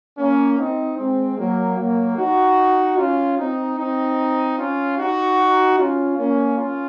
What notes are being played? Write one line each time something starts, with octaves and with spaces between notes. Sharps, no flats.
A#3 C#4
C4 D#4
G#3 C4
F#3 A#3
F#3 A#3
D#4 F#4
C#4 F4
C4 D#4
C4 D#4
C#4 F4
D#4 F#4
C#4 F4
A#3 C#4
C#4 F4